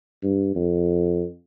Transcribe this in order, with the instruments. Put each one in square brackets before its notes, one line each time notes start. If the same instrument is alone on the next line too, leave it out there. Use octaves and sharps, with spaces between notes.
[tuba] G2
F2